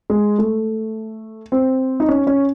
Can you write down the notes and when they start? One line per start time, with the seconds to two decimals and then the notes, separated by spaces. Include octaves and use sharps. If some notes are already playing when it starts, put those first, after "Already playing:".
0.10 G#3
0.39 A3
1.52 C4
2.00 D#4
2.09 C#4
2.27 C#4